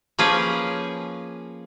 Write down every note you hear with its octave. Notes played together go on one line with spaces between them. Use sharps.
F3 A#3 C#4 G#4 B4 C#5